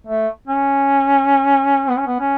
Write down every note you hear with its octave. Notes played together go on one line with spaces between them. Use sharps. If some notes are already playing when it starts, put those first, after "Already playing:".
A3
C#4
B3
C#4
B3
C#4